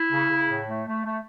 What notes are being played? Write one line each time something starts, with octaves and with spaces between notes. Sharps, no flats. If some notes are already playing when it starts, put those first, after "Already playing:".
Already playing: E4
C#3
C#3
A2
A3
A3
A3